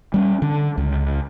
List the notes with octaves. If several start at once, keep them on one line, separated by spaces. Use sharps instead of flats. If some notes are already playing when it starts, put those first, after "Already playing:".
G3 A3 C#4
D3
C#2